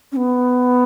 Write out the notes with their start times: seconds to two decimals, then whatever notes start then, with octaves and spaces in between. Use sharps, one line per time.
0.12 C#4
0.17 B3